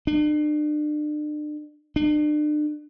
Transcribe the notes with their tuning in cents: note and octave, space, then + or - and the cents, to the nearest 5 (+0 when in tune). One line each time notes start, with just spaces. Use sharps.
D4 +40
D4 +40